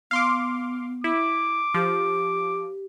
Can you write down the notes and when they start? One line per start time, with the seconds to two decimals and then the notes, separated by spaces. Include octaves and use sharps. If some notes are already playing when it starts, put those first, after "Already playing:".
0.11 B3 F5 C6 D6
1.04 E4 D6
1.74 F3 G4